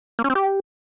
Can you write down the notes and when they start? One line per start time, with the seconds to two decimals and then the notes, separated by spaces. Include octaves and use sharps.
0.19 A#3
0.24 C#4
0.30 C4
0.35 G4